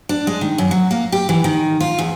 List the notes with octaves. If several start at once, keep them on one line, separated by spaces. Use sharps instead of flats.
D4
G#3
D#3
F#2
F#3
A#3
G4
E3
D#3
F4
E2